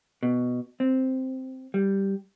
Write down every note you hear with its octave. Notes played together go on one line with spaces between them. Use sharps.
B2
C4
G3